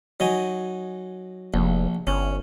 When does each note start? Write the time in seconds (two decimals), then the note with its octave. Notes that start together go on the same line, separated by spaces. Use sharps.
0.20 F#3 D#4 G#5
1.54 F1 A#1
2.07 G1 C#4